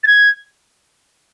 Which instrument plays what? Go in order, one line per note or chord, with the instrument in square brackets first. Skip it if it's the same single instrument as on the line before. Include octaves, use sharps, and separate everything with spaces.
[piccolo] A6
G#6